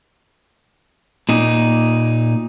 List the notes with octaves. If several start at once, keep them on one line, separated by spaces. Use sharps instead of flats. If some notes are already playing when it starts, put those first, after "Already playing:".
A#2 D#4